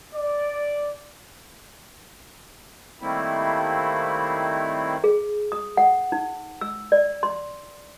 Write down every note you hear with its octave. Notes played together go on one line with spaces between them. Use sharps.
D5
D#3 G3 A3 A#3 C4 E4
G#4
D#6
F#5
D#4
E6
D5
C6